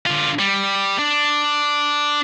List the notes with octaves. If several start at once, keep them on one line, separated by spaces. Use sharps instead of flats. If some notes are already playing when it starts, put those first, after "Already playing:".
D3 F4
G3
D4